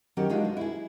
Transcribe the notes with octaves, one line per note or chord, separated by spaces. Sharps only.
D#3 F#3 C#4 G4
G#3 D4 D#4 F4 F#4
B2
E4 G#4